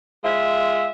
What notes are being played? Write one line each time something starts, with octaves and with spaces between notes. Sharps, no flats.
G#3 F4 E5